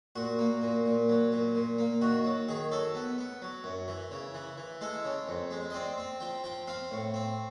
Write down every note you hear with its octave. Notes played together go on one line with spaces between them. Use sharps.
A#2 F#4
A#3
A#2
A#2
F#3
A#2
A#2
A#3
D#3 F#4
F#3
D#3 G#4
F#3 A4
B3
B3
F#3
F#2
E3
C#3
E3
E3
G#3 A4
C#3
F2
G#3
D#5
C4 D5
C4
F3 G5
F3 G5
C4 F5
A2
C4